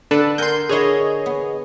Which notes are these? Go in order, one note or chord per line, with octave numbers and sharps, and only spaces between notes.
D3 D4 A4 B4
A#4 F#5 G#5 C6 G6
D3 E4 G#4 C#5 D#5
B3